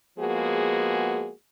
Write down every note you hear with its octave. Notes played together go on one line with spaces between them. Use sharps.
F3 G#3 A#3 B3 F#4 G#4